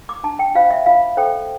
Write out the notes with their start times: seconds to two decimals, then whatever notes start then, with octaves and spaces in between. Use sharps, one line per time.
0.09 D6
0.23 D4 A5
0.39 G5
0.55 F4 C5 F5
0.70 E5
0.86 F4 F5
1.17 A4 C5 G5